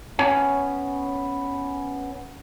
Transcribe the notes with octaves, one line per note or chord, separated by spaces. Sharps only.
B3 C#4 C#5 G#5